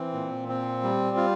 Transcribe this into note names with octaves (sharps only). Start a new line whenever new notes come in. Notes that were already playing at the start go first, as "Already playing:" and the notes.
Already playing: E3 C4
A#2
C4
G3
F4